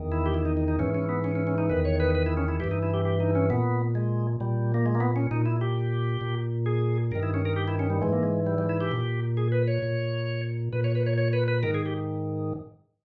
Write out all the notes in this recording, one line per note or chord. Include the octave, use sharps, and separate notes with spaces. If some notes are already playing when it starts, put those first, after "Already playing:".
Already playing: E2 D#3
E4
G4
E4
D#4
D#4
D#4
G#2 E3 C#4
C#4
B3
C#4
C#4
C#4
D#4
E2 D#3 B4
C#5
B4
B4
E4
C#4
E4
G2 E3 G4
D#4
E4
G4
G4
D#4
C#4
A#2 B3
G#3
A#2 G3
A#3
G#3
A#3
B3
C#4
A#2 D#4
E4
G4
A#2
G#4
G2 D#3 A#4
E4
C#4
A#4
G4
E4
C#4
G3
G#2 E3 G#3
A#3
G#3
G3
G3
E4
G4
A#2
G#4
B4
C#5
A#2
A#2 B4
C#5
B4
C#5
C#5
B4
B4
G#2 D#3 A#4
G#4
G4